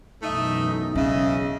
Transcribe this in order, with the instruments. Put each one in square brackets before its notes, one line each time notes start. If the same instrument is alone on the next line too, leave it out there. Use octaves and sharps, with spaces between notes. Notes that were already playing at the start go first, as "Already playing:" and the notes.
[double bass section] B1 F#2 E3 [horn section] A3 D#5 E5 [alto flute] D#4
[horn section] C#3 D#5 [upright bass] C#4 [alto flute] E5